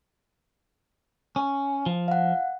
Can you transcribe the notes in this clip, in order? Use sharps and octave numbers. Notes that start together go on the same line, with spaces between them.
C#4
F3
F5 F#5